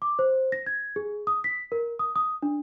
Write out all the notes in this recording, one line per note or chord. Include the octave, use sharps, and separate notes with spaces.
D6
C5
A#6
G#6
G#4
D#6
B6
A#4
D#6
D#6
D4